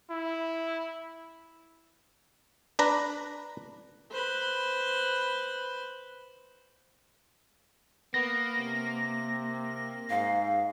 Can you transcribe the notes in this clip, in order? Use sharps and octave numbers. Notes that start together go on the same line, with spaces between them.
E4
D4 B4 A#5
B4 C5
A#3 B3 A#6
C3
G#2 F5